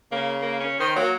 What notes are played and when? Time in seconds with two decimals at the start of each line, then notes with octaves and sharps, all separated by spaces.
0.12 C#3 A#3
0.42 A#3
0.60 C#4
0.80 D#3 C5
0.96 F#3 A#3